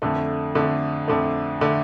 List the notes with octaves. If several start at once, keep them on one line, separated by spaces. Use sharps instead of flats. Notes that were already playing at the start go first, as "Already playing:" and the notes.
F2 D3 A3
F2 D3 A3
F2 D3 A3
D3 A3